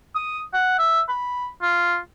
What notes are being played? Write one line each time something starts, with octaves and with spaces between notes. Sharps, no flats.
D#6
F#5
E5
B5
F4